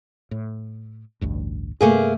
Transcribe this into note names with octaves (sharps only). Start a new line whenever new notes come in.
A2
A1 D2 G2
G2 C3 A3 A#3 G#4